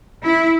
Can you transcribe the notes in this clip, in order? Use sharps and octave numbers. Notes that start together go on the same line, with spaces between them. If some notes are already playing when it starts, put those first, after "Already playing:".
E4